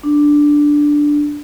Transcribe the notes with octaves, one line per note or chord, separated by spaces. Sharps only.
D4